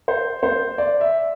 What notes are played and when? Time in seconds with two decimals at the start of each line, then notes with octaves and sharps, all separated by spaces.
0.08 C5
0.43 C5
0.78 D5
1.01 E5